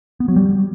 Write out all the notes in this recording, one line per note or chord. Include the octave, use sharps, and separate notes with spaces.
B3
F#3
G3